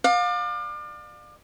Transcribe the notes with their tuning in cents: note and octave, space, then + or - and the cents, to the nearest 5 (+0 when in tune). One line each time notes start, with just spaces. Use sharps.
D5 +35 F5 +30